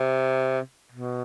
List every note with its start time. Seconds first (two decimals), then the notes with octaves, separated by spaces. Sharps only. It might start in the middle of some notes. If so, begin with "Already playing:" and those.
Already playing: C3
0.92 B2